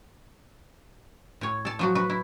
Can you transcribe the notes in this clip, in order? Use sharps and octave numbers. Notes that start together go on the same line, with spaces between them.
A2 C#5
A4 A5
F3 F#3 F#4
F#4 B4
E4